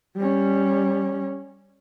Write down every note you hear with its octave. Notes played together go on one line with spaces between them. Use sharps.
G3 C#4